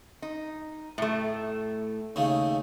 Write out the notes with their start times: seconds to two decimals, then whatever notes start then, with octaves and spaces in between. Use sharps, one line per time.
0.22 D#4
0.98 A2 A3
2.16 D#2 C#3 A3